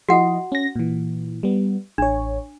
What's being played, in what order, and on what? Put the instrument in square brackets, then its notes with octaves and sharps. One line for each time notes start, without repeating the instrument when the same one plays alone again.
[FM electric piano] F3 E4 D#5 [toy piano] F#4 F#5
[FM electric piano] C#4 A#6
A#2 E3
G3 B3
[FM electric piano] A1 C#5 [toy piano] D4